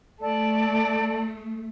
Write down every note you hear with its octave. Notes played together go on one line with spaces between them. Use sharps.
A3 A4 D5 A5